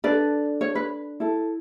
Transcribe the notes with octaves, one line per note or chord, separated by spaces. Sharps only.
D4 A4 B4 D5
C#5
B4
E4 A4